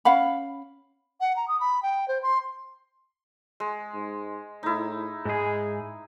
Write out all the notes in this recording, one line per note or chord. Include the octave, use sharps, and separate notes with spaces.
C#4 F5 F#5 B5
F#5
A#5
D#6
B5
G5
C5
C6
G#3
G#2
A2 D#4 E4
G#2 G#3 G#4